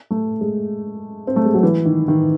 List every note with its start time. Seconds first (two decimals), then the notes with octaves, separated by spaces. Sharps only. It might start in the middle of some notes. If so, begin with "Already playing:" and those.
0.11 A3
0.41 G#3
1.27 C4
1.36 A3
1.45 G#3
1.54 F#3
1.63 E3
1.85 D#3
2.08 D#3